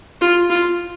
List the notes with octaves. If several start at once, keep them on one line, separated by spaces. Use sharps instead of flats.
F4
F4